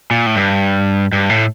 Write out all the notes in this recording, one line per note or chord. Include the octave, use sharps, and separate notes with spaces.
A#2
A2
G2
G2
A2